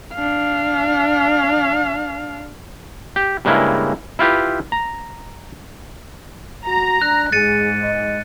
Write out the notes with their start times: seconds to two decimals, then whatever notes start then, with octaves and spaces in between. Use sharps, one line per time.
0.14 D4 F5
3.16 G4
3.45 G2 C#3 G#3 A#3 E4
4.19 E4 F4 G4 B4
4.72 A#5
6.67 F#4 A#5
7.02 D4 F#6
7.32 G#2 G#4 A6 C#7 D#7
7.83 D#5